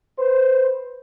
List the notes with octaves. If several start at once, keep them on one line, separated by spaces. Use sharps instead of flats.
B4 C5